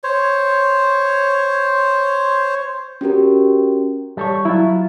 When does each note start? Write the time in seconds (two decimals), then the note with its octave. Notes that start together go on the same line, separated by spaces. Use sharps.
0.04 C5 C#5
3.01 C#4 F#4 G4 A#4
4.17 G3 A4 C#5
4.45 F#3 E4 F4